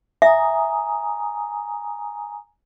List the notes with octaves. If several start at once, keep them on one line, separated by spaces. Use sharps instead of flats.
E5 G#5 A#5 D#6